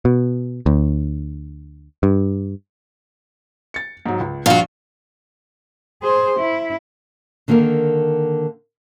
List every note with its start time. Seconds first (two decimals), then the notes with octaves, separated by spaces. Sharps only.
0.05 B2
0.66 D2
2.03 G2
3.74 A6 C#7
4.06 G#2 F#3
4.20 C#2
4.46 A#1 G2 F3 F4 F#4
6.02 G#4 C5
6.39 E4
7.48 D3 D#3 A#3 A4 A#4